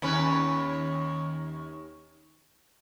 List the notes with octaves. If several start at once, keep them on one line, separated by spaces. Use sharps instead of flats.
D#2 C#4 B4